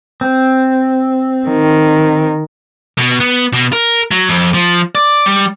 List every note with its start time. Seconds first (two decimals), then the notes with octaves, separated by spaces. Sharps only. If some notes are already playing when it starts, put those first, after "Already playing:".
0.21 C4
1.48 D#3
2.98 B2
3.20 B3
3.54 B2
3.73 A#4
4.11 F#3
4.29 F2
4.54 F3
4.95 D5
5.26 G3